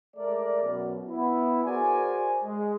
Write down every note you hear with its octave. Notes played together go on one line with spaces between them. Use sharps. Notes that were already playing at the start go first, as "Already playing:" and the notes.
G#3 A3 A#4 D5
F#2 B2
B3 E4
F#4 G#4 A#4 C5 D5 G#5
G#3